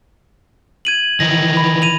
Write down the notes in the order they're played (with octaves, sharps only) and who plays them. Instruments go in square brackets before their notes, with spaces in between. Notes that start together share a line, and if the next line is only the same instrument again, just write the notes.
[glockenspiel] G#6 D#7 F#7
[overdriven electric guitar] D#3 E3 [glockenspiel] A#6
[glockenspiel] B5
D#7 F7